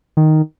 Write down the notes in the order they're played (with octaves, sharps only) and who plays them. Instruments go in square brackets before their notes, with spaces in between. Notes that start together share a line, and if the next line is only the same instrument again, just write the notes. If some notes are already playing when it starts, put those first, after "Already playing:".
[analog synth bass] D#3